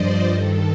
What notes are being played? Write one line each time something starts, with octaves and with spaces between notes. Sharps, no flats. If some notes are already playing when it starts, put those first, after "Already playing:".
Already playing: G2 F3 C5 D5 D#5
G2 D#3 A4